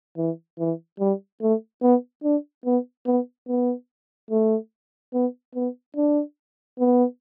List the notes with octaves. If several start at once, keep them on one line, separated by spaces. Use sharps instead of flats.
E3
E3
G3
A3
B3
D4
B3
B3
B3
A3
B3
B3
D4
B3